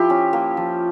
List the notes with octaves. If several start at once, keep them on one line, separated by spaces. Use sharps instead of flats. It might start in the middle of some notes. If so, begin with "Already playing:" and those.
Already playing: F3 E4 G4
C#4
A#3
F3